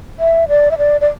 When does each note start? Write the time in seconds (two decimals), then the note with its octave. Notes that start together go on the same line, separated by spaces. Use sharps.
0.19 E5
0.49 D5
0.71 E5
0.78 D5
1.01 D5